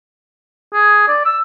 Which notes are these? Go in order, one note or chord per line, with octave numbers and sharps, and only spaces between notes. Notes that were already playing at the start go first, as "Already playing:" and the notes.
G#4
D5
E6